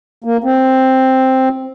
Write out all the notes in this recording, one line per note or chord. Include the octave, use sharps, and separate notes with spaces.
A#3
C4